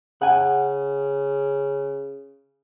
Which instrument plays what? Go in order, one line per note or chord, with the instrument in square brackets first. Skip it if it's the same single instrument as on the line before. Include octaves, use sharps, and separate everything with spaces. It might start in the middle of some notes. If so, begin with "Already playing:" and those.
[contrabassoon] C#3 [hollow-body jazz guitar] F#5 G#5